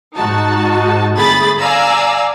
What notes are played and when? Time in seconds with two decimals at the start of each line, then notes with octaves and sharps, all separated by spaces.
0.17 G#2 D#4 F#4 A5
1.16 G1 A3 G#4 B5 A6
1.59 D5 F5 G#5 A#5 E6